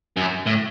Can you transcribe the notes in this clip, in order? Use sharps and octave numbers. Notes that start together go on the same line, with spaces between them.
F#2
A2